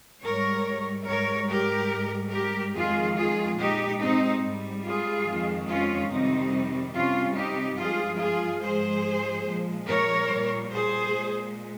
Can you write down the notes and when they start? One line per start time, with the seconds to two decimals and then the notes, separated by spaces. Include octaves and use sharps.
0.23 G#2 G3 A#4 C#5
1.07 G#2 G3 A#4 C#5
1.49 G4 A#4
1.91 G#2 G3
2.33 G4 A#4
2.75 F2 D#3 G#3 F4 G#4
3.17 F4 G#4
3.59 A#2 G#3 D#4 G4
4.01 C4 D#4
4.43 G#2 G3
4.85 F4 G#4
5.27 F2 D#3 G#3
5.69 C#4 F4
6.11 F2 C3 D#3 G3 C4 D#4
6.95 C3 G3 C#4 F4
7.37 D#4 G4
7.79 G2 F3 G#3 F4 G#4
8.20 F4 G#4
8.63 G#2 F3 G#3 G#4 C5
9.47 A#2 F3 G#3
9.89 A#4 C#5
10.30 A#2 G3
10.73 G#4 C5
11.15 A#2 G#3